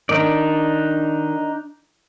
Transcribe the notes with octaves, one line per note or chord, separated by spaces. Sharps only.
D#3 D4 D#4 D5